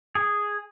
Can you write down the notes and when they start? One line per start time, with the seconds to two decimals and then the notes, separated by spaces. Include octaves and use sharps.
0.15 G#4